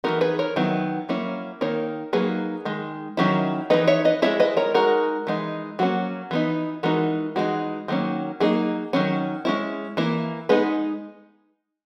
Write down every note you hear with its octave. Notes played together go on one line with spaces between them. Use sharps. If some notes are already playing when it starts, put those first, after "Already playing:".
E3 B3 D#4 F#4 A#4
G#4 B4
A#4 C#5
D#3 F#3 B3 E4
F#3 A#3 C#4 E4
D#3 A#3 D#4 A#4 C#5
F#3 A#3 D#4 G#4 B4
D#3 G#3
D#3 F#3 C#4 E4
E3 B3 D#4 B4 D#5
C#5 E5
B4 D#5
G#3 C#4 E4 C#5 E5
B4 D#5
A#4 C#5
G#3 D#4 F#4 A#4
E3 G#3 D#4
F#3 A#3 C#4 F#4
E3 B3 D#4
E3 G#3 D#4 F#4 A#4
E3 G#3 B3 D#4 F#4
D#3 F#3 A#3 C#4
F#3 A#3 D#4 E4 G#4
D#3 F#3 C#4
G#3 C#4 E4
E3 A#3 E4
G#3 B3 D#4 G#4 B4